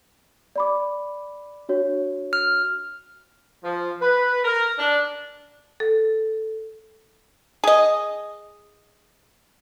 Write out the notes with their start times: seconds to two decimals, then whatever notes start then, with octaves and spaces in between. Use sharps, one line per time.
0.56 D5 B5 D6
1.69 D4 F#4 C#5
2.33 F6
3.63 F3
4.01 B4
4.45 A#4
4.78 D4
5.80 A4
7.64 G#4 D#5